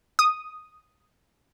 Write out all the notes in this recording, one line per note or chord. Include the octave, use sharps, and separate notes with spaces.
D#6